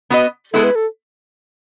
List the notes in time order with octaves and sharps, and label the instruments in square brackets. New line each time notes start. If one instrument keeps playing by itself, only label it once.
[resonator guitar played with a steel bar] B3 F#4 B4 D#5
[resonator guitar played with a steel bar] G#3 B3 E4 [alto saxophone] A4
[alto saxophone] B4
A4